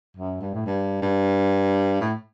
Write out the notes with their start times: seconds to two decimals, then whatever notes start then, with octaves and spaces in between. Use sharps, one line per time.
0.17 F#2
0.41 G2
0.54 A2
0.66 G2
1.02 G2
2.01 A2